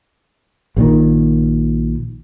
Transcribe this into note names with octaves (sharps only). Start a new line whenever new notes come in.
A#1 A#2 D#3